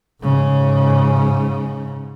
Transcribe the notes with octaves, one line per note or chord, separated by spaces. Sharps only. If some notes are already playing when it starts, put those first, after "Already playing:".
G#2 C#3